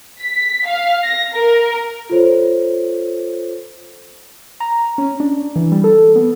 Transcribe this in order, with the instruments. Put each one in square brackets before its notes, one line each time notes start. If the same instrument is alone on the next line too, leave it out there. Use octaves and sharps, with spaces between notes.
[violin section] B6
F5
A#6
A#4
[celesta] F4 A4 C5 C#5
[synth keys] A#5
C#4
D4
E3
G3
A4
B3